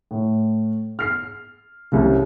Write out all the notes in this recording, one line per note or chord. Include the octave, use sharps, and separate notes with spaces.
A2
F6 C7
C2 C#3